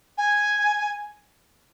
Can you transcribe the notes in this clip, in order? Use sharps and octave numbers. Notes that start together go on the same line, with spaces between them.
G#5